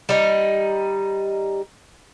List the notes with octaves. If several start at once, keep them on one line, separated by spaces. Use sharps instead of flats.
G3 D#4